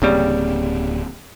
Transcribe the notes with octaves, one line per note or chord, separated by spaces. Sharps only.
D1 G2 C#3 G3 A#3 C4